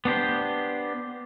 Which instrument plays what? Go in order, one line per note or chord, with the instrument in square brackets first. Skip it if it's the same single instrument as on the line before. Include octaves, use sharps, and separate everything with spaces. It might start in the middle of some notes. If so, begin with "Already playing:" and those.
[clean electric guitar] B3 D4 G4 C5